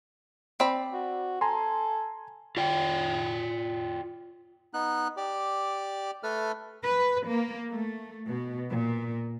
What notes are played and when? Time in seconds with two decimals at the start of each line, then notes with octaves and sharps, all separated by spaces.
0.60 C4 D5 B5
0.93 F#4
1.41 A4 G#5 A#5 C6
2.57 F4 D5 G5
4.74 B3 D#4 F#6
5.17 G4 D5
6.23 A3 A4 B4 F6
6.84 B4
7.28 A#3
7.71 A3
8.28 B2
8.71 A#2